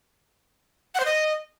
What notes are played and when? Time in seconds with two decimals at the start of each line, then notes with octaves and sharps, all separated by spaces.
0.95 F#5
1.00 C5
1.05 D#5